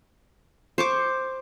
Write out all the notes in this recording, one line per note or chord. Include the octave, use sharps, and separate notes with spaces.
C5 C#6 D6